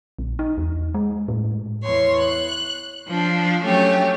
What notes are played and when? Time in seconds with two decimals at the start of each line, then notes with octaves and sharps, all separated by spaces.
0.19 A#1
0.39 D#4
0.57 E2
0.94 G#3
1.28 A2
1.82 E2 C#5 C6
2.17 F#6
3.07 F3 D4
3.62 F#3 A3 C#4 G4